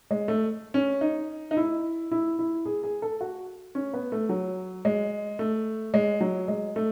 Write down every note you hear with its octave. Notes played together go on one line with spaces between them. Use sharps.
G#3
A3
C#4
D#4
D#4
E4
E4
E4
G#4
G#4
A4
F#4
C#4
B3
A3
F#3
G#3
A3
G#3
F#3
G#3
A3